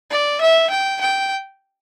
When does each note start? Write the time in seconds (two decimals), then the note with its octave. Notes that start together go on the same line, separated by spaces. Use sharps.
0.11 D5
0.41 E5
0.70 G5
1.00 G5